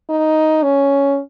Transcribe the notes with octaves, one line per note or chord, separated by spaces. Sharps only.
D#4
C#4